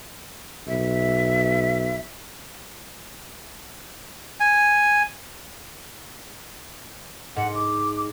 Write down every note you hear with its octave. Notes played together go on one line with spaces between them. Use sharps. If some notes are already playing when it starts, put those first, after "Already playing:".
B1 E5
G#5
G#2 F#5
D6